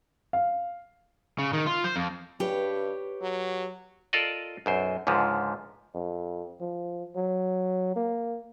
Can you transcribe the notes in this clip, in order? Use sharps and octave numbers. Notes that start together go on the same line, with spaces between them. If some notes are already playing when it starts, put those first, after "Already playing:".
F5
C#3
D#3
F4
C5
F2
G2 G4 B4 C#5
F#3
F4 A4 A#4 D5 D#5
B1 F#2 C5
C#2 G#2 D3 F3
F2
F3
F#3
A#3